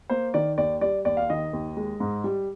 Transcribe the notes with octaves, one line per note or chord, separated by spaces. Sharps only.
A#3 C5
D#3 D5
D#2 D5
G3 D5
D#2 D5
F5
D#3 D#5
D#2
G#3
G#2
G3